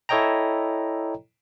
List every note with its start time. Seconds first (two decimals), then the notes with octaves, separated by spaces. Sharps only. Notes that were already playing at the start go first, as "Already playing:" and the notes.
0.09 E4 A4 C#5 D#5 G5 A#5